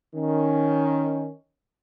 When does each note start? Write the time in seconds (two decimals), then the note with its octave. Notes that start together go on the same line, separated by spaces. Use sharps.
0.15 D#3 C#4